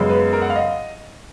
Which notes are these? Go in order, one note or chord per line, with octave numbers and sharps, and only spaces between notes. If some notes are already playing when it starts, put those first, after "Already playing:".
Already playing: F#2 C#3 G#3 B3
B4
A#4
F#5
F5
D#5